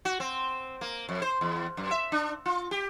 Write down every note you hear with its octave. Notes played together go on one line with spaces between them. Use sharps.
F#4
C4
A#3
F2
C5
E2
F#2
E5
D4
F4
G4